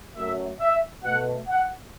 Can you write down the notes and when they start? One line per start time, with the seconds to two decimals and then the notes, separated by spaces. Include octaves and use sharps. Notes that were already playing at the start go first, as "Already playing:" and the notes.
0.16 F#2 F#3 A3 E5
0.60 E5
1.03 B2 A3 F#5
1.48 F#5